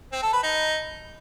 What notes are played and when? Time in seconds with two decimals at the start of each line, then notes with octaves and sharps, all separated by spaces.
0.12 C4
0.23 A4
0.33 B4
0.43 D#4